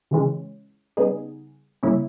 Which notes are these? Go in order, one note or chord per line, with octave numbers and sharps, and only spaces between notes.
C#3 E3 G#3 C#4
C#3 G3 B3 D#4 G#4
C#3 G3 A#3 C#4 E4